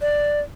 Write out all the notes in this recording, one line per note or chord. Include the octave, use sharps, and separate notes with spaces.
D5